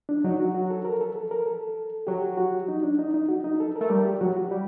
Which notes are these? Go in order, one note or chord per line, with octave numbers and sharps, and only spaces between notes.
D4
F#3 D#4
F#4
F#4
A4
A#4
A4
A4
A#4
A4
F#3 G4
F#4
D#4
D4
D#4
D#4
F#4
D#4
A4
A#4
A3
G3 A#4
G4
F#3 F#4
F#4
G3